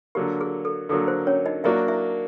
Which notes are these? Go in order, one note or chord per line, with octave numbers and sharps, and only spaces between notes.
D3 F#3 A#3 G4
G#4
A4
D3 F#3 A#3 A4
C5
C#4 C#5
D#4 D#5
F#3 A#3 D4 E4 F#4 E5
E4 E5